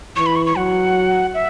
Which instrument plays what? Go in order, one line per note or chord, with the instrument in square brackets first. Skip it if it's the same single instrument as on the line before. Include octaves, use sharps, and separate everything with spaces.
[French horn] E3 [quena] C#6
[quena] B5
C#6
C#6
[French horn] F#3 [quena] F#5
[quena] E5